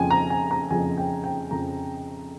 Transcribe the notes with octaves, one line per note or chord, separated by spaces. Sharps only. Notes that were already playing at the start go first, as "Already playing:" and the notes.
Already playing: F2 C#3 F3 G5 G#5
A#5
G#5
A#5
F2 C#3 F3 G#5
G5
G5
F2 C#3 F3 A#5